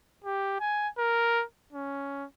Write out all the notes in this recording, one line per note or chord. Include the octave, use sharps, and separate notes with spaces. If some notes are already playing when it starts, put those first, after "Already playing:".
G4
G#5
A#4
C#4